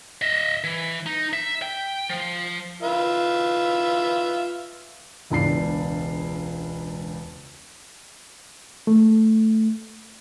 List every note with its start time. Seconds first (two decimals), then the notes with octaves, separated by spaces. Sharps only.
0.22 D#5 E5
0.64 E3
1.06 D#4
1.33 E5
1.62 G5
2.09 F3
2.82 F4 B4 E5
5.30 E1 C#2 D4 C7
8.87 A3